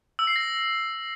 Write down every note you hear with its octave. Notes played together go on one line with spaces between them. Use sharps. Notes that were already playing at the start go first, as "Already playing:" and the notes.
E6
C7
A#6